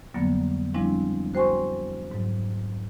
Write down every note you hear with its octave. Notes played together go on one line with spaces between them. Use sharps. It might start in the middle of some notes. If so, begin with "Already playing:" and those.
F2 D3 F#3 G3 A#3 B3
F3 G3 G#3 C4 D4 E4
F#4 C5 G5 G#5 C6 C#6
G#2 F#3